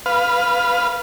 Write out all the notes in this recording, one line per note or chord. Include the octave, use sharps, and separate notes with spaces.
B4 F5